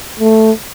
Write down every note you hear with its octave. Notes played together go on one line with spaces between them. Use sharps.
A3